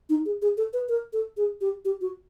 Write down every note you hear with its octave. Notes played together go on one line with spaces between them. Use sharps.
D#4
G#4
G#4
A4
B4
A#4
A4
G#4
G4
G4
F#4